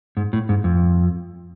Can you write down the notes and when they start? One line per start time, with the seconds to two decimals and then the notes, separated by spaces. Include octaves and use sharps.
0.17 G#2
0.33 A2
0.49 G#2
0.64 F2